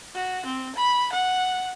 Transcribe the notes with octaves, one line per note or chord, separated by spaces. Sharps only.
F#4
C4
B5
F#5